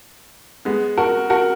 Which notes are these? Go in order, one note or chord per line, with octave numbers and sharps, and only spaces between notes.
G#3 B3
F#4 A#4
F#4 A#4